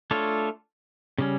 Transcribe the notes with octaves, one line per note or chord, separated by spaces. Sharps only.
A3 D4 F4 A4 C#5
C#3 G3 C#4